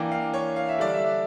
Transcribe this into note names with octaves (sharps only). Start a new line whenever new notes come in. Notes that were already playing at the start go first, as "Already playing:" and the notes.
Already playing: E3 A#3 D4 G5
F5
C#5
F5
E5
D3 G3 D4 D5
E5